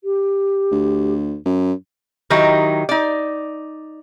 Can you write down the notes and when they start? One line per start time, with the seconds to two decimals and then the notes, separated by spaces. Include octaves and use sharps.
0.04 G4
0.71 D2
1.45 F#2
2.30 D#3 F#3 D#4 E4 G4
2.89 D#4 D5